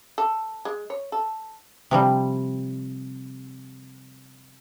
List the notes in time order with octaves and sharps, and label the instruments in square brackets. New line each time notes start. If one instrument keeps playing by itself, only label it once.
[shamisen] A4
G#3
C#5
A4
[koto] C3 F3 G3